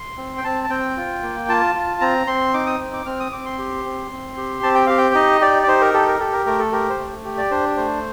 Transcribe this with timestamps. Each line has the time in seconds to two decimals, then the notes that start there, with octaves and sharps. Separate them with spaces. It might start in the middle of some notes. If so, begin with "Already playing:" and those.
Already playing: C6
0.18 C4
0.38 G5
0.44 C4 A5
0.64 A5
0.70 C4 G5
0.97 F4
1.23 A#3
1.48 F4 A5
1.75 F4
2.01 C4 A#5
2.27 C4 C6
2.54 D#4 D6
2.67 D#6
2.80 C4
2.93 D6
3.06 C4 F6
3.20 D#6
3.32 C4 D6
3.45 C6
3.58 G4
3.85 C4
4.11 C4
4.37 G4
4.63 C4 A5
4.75 G5
4.87 G4 F5
4.98 G5
5.15 D#4 D#5
5.41 G4 D5
5.63 D5
5.67 D#4 C5
5.81 A#4
5.94 G4 A4
6.07 A#4
6.20 G4 A4
6.33 A#4
6.46 A3 A#4
6.59 A4
6.72 G4 A#4
6.89 C5
6.99 A3
7.25 G4
7.38 D5
7.51 D4 C5
7.77 A3 C5